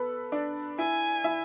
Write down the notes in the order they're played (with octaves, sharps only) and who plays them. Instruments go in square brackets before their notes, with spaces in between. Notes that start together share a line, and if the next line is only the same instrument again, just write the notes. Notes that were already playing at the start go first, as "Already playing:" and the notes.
Already playing: [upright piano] B3 A4 B4
D4 D5
[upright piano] E4 E5 [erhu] G#5
[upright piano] E4 E5